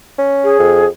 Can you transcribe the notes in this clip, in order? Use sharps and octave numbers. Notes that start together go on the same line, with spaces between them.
C#4
G#4
F2